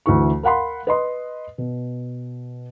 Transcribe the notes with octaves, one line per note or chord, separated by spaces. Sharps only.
D2 E3 C#6
A#4 F5 F#5 B5 C6
B4 D#5 C6
B2